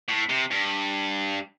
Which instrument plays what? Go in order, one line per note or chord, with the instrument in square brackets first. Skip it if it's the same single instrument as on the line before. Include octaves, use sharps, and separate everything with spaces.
[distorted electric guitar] A2
C3
G2